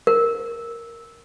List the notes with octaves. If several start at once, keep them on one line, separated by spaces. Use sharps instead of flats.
A#4